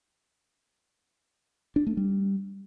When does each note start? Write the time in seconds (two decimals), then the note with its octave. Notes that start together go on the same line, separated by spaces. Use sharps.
1.76 D4
1.87 A3
1.97 G3